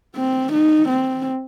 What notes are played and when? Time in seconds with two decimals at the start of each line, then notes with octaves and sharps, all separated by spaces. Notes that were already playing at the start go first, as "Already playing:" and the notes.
0.16 C4
0.53 D#4
0.89 C4